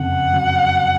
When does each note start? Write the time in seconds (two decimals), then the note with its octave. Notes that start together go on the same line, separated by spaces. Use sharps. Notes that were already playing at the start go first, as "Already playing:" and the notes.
Already playing: F#1 F2 C#3 F#5
0.33 F#3